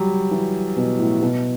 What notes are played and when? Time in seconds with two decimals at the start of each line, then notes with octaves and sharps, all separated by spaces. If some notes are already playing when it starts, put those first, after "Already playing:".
Already playing: F#3 G3
0.31 E3
0.77 B2
0.99 A2
1.22 B2